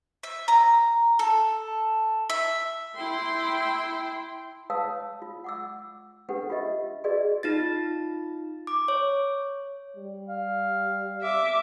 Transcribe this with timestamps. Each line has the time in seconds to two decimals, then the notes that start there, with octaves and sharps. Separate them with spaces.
0.23 E5
0.48 A#5
1.19 A4
2.30 E5
2.96 E4 G5 C6
4.70 B4 C#5 F5 A5 D#6 E6
5.22 F4
5.44 F#5 D6 E6
6.29 C#4 D4 G4 A4 B4 F#5
6.50 F4 G4 A#4 B4 D#5 E5
7.04 F#4 G#4 A#4 B4 D5 D#5
7.43 D#4 F4 A6
8.67 D6
8.88 C#5
9.96 G3
10.28 F5
11.22 E5 D6